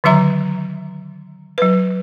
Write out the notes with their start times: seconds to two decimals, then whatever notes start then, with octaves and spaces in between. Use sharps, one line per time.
0.04 D3 D#3 F#3 E5 A#5
1.58 F#3 B4